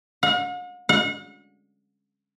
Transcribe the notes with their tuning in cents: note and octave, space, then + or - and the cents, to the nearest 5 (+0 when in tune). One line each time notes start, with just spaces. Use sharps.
F#5 -45
F#5 -40